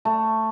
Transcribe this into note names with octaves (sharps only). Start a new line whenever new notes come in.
A3